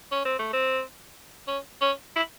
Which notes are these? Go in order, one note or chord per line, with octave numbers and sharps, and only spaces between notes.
C#4
C4
A3
C4
C#4
C#4
E4